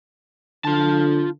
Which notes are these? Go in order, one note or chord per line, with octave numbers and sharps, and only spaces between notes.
D3 F4 A5